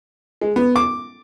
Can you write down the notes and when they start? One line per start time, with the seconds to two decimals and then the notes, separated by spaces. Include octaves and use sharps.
0.41 G#3
0.56 B3
0.76 D6